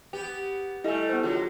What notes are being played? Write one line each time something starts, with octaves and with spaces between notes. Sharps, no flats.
B3 G4
G3 A3 E4 A4 D#5 E5 G#5
B3 C5
B2 D3 F#3 F4 G#4